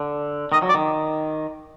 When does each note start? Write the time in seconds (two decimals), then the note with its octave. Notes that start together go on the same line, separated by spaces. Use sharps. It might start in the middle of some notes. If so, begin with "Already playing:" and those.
Already playing: D3
0.52 D#3 D#5
0.62 F#3
0.69 D5
0.74 D#3